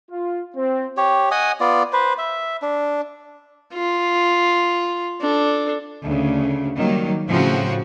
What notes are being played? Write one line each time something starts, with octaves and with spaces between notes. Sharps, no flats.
F4
C4
G4 C#5
D#5 F#5 G#5 D#6
B3 F4 D5
B4 C5
E5
D4
F4
D4 A4
D2 C#3
D#3 F#3 G3 A#3
A2 C#3 F3 C4 F#4